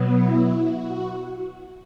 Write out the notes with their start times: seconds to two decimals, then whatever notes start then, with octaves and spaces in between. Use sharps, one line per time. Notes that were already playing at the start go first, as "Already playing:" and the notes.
Already playing: B2 F#3 B3
0.08 E4
0.59 F#4